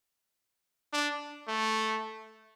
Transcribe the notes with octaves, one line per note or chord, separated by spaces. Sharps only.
D4
A3